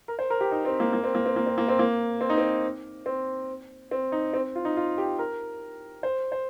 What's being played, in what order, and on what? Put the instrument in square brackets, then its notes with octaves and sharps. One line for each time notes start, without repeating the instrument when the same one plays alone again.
[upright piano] A#4
C5
A#4
G4
D#4
C4
A#3
A#3
C4
A#3
C4
A#3
C4
A#3
C4
A#3
C4
D#4
C4
C4
C4
D#4
C4
F4
D#4
F4
G4
A#4
C5
C5